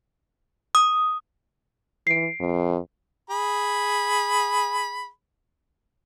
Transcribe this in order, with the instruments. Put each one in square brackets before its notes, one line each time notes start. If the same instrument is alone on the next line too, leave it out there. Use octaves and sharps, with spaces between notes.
[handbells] D#6
[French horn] E3 [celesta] C7 D7
[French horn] F2
[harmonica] G#4 B5